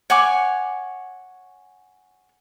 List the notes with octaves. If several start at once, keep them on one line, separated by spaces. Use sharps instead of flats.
C#5 F#5 G#5 D6